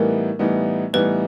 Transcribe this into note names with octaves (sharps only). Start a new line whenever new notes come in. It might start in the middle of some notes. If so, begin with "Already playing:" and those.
Already playing: A2 E3 G3 B3 D#4 A#4
A2 E3 G3 B3 D#4
A2 E3 G3 B3 D#4 B4